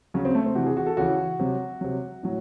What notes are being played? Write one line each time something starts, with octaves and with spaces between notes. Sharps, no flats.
C#3 F#3 C#4
C4
A3
C4
C3 E3 F#4
G#4
F#4
A4
C#3 E3 F#4
C3 F#3
C3 F#3
A2 F#3